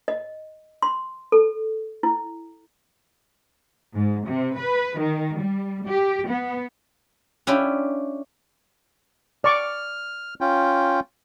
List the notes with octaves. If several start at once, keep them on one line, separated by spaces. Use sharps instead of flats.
D#5
C6
A4
E4
G#2
C3
B4
D#3
G3
G4
B3
C#4 D4 E4 F4 G4
D5 C#6 D6 F6
C#4 F4 G5